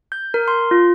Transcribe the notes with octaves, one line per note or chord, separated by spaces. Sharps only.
G6
A#4
C6
F4